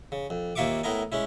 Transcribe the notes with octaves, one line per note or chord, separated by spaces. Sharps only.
C#3
F2
D#2 A#3 F4 E5 C#6 D6
A2 B3 E4 A#4 D#5 G#5
G#3 C#4 E4